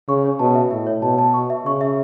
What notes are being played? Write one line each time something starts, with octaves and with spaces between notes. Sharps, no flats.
C#3 C#6
C#5
B2 A5
E5
A2 E5
C#5
B2 A5
A5
C#6
E5
C#3 C#6
E5